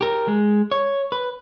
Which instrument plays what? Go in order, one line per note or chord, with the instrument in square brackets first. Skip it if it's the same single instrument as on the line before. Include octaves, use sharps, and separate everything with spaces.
[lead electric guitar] G4 A#4
G#3
C#5
B4